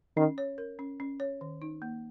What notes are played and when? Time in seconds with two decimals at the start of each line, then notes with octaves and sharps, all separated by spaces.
0.16 D#3 C#4
0.38 C#5
0.58 A#4
0.79 C#4
1.00 C#4
1.20 C#5
1.41 D#3
1.62 D#4
1.82 A#3